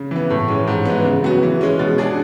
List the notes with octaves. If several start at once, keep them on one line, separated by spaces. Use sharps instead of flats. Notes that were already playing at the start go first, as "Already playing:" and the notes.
Already playing: C#3
E3 B3
A2
E3 G#3 C#4
G#2
E3 G#3 B3
C#3
F#3 B3 F#4
E3
G#3 C#4
B2
G#3 D4 G#4